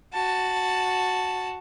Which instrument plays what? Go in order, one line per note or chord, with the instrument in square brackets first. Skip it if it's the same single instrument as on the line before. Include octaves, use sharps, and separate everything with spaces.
[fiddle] F#4 A5